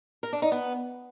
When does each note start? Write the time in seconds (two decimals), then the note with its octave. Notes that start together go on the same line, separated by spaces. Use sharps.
0.23 A#4
0.33 D4
0.42 D#4
0.52 B3